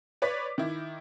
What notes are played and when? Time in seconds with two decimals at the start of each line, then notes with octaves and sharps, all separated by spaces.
0.22 B4 C#5 D5 D6 B6
0.58 D#3 E4